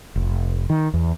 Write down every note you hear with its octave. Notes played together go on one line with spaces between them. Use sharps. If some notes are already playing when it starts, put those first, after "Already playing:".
F1
D#3
E2